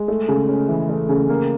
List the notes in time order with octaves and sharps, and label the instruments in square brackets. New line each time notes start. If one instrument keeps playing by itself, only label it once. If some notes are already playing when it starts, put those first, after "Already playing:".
Already playing: [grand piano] G#3
A3
C#3
C#4
E3
A3
C#3
A#3